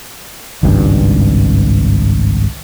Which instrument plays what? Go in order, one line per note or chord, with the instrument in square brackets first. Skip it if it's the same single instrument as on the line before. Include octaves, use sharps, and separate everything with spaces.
[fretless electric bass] G#1 C#2 G2